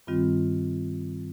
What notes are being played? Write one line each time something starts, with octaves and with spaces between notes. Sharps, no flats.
G2 D#3 G3 C4 F4